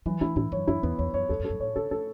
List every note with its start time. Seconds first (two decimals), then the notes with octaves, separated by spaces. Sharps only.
0.06 E3 F#3
0.21 A3 E4
0.36 A2 E4
0.52 F#2 C#5
0.67 F#2 E4
0.83 E2 B3
0.99 E2 C#5
1.14 F#2 C#5
1.29 E2 A4
1.40 F#2
1.45 A4
1.50 F#2
1.60 A2 C#5
1.76 C#3 A4
1.91 A3 A4